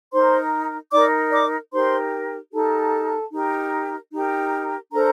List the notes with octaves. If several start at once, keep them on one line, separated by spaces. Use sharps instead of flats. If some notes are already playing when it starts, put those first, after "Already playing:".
D#4 A#4 C5 C6
D#4 A#4 D5 D6
D5 D6
D#4 G4 A#4 C5 C6
D#4 G4 A4 A#4 A5
D#4 G4 A#4
D#4 G4 A#4
D4 A4 A#4 C5 A#5